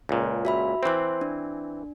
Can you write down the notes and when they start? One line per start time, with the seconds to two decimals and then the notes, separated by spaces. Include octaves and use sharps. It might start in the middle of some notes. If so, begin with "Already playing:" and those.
0.09 C#2 A#2
0.45 F#4 E5 B5
0.83 E3 C4 C5 C6
1.21 D4